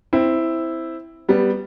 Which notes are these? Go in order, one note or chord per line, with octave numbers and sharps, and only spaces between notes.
C4 E4
G3 B3